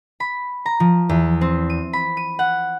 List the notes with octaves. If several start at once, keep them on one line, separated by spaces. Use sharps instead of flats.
B5
A#5
F3
E2
C4
D#7
B5
D#7
F#5